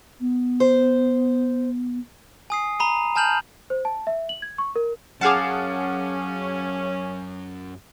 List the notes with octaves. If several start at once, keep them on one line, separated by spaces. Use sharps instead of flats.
B3
C5
G#5 D#6 C7
A#5 B5 D#7
G#5 A5 F6 G6 F7 F#7
C5
A5
E5
F#7
G#6
C#6
A#4
F#2 C#4 G#4 F5 F#5 A5 D6